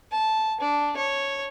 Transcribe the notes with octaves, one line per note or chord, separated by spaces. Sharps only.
A5
D4
C#5